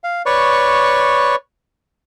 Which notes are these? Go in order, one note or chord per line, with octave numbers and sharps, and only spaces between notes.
F5
B4 C#5 D5 C#6